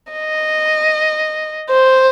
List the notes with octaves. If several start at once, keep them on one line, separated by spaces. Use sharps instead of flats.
D#5
C5